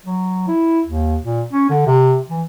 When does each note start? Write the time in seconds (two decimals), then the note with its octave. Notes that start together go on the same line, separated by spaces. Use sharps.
0.06 F#3
0.48 E4
0.86 D#2
1.24 A#2
1.53 C#4
1.70 D3
1.87 C3
2.30 E3